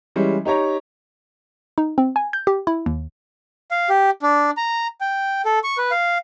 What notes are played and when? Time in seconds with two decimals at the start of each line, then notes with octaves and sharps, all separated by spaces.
0.16 E3 G3 G#3 C#4
0.45 D#4 G4 C#5 A#5
1.78 D#4
1.98 C4
2.16 G#5
2.33 G6
2.47 G4
2.67 E4
2.86 D#2
3.71 F5
3.89 G4
4.22 D4
4.57 A#5
5.01 G5
5.45 A4
5.64 C#6
5.78 B4
5.91 F5